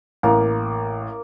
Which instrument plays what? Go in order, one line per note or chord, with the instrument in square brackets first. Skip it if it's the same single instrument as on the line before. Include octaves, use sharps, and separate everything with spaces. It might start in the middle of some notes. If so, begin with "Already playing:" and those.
[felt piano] A1 [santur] A#3